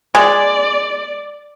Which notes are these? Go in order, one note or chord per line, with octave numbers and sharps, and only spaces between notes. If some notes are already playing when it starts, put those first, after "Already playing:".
G#3 D5